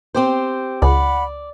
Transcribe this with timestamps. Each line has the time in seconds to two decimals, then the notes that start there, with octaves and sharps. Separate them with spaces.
0.15 C4 G4 C5
0.82 C#2 D5 F#5 B5